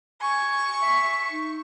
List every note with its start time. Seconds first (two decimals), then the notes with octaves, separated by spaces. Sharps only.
0.21 G#5 C#6
0.82 E5
1.31 D#4